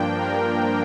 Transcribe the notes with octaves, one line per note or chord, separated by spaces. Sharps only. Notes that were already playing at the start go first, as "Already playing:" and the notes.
Already playing: G2 F3 A#3 D4 G5
A#4